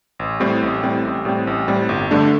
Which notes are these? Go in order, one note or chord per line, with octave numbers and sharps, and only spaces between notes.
A1
A2 G3 C4
A1
A2 G3 C4
A1
A2 G3 C4
A1
A2 G3 C4
G1
G2 D3 A3 D4